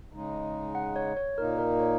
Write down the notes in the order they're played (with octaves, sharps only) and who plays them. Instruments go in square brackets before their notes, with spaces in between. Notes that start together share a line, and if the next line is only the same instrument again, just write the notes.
[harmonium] C#3 G#3 D#4
[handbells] F#5
C#5
C#5
[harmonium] A#2 A#3 D#4 [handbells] A#4
[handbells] A#4
C#5